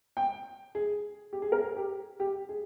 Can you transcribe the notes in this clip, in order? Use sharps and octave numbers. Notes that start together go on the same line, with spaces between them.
G5
G#4
G4
G#4
A#4
G#4
G4
G4
G#4